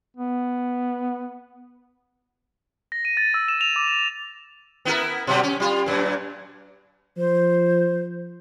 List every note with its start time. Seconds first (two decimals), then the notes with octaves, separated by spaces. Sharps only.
0.17 B3
2.92 A#6
3.05 D#7
3.17 A6
3.34 E6
3.48 E7
3.61 F7
3.76 D6
3.88 E7
4.85 B3 E4 A#4
5.27 B2 F#3 G3
5.43 C#4
5.60 G3 F4
5.86 F#2 A#2
7.17 F3 C5